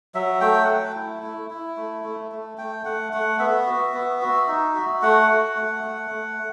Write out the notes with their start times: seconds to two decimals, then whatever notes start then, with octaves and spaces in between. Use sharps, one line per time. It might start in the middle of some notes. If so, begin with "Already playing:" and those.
0.15 F#3 E5
0.41 A3 G5
0.64 F#5
0.68 A3 G5
0.95 E4
1.22 E4
1.50 E4
1.77 A3
2.04 A3
2.32 A3
2.58 A3 G5
2.85 A3 F#5
3.12 A3 F#5
3.39 B3 E5
3.66 F#4
3.94 B3
4.22 F#4
4.48 D#4
4.75 F#4
5.02 A3 F#5
5.29 F#4
5.56 A3
5.84 A3
6.11 A3